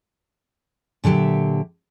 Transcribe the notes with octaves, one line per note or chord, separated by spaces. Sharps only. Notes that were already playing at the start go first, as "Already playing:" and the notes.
A#2 D3 F#3 G4 E5